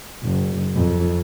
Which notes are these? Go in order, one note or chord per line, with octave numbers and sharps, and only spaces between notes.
F#1
F2